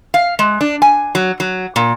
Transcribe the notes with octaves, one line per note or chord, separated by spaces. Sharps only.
F5
G#3
D4
G#5
F#3
F#3
A#2